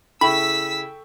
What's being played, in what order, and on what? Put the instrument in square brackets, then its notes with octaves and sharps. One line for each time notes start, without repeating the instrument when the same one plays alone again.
[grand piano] C#3 E4 [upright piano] A4 G5 C#6 [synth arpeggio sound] B5 [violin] E6 B6